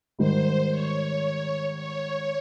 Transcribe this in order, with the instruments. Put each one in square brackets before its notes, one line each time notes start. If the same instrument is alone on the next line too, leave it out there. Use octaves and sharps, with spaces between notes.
[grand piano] G#2 D#3 G3 [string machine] C5
[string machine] C#5
C#5